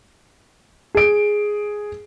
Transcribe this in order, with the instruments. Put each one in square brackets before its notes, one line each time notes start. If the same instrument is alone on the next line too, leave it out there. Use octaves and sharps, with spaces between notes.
[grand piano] G#4 D7